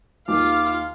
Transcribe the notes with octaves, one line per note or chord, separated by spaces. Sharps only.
D#2 F4 F5 D6